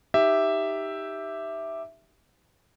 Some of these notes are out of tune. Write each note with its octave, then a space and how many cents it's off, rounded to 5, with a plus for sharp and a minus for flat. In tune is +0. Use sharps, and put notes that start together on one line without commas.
D#4 +0 G4 +0 E5 +0